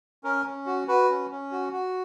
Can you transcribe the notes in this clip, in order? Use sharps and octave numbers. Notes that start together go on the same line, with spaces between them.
C#4 A#4
C#4
F#4
F#4 B4
C#4
C#4
F#4
F#4